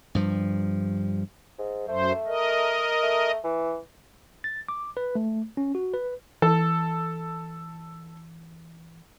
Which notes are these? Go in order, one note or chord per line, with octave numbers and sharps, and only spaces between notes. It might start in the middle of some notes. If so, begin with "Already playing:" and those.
G2 F3
G#2
F#2 A3 C5
A#4 D#5
A3
E3
A6
D6
B4
A3
C#4
F#4
B4
E3 A4